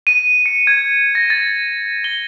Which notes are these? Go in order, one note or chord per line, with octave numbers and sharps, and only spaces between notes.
D#7
C#7
G#6
A#6
A6
G7